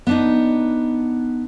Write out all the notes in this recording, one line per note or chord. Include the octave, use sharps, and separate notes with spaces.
B3 D4 D#4